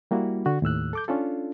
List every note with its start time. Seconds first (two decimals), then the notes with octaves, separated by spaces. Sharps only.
0.11 G3 A#3 E4 F#4
0.46 D3 F#4
0.62 D#2 A2 E6 F#6
0.93 A4 D6 G6
1.08 C#4 D4 F4 A4